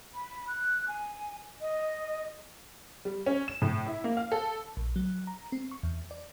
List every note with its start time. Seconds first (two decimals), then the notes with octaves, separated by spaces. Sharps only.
0.14 B5
0.48 F#6
0.88 G#5
1.61 D#5
3.05 G3
3.26 C#4
3.48 E7
3.62 A2
3.86 E4
4.04 A#3
4.17 F5
4.32 A4
4.77 A#1
4.96 F#3
5.27 A#5
5.52 C4
5.71 C#6
5.83 E2
6.11 D5